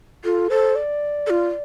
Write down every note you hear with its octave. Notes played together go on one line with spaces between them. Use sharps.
F4 A4
A4 C5
D5
A4
F4